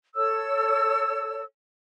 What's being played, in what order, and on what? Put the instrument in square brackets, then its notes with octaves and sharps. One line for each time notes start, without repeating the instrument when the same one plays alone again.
[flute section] A4 C#5 E6